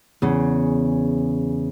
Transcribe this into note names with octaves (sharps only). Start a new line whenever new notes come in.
E2 C#3